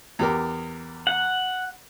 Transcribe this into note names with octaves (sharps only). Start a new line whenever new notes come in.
E2 G4 A#4
F#5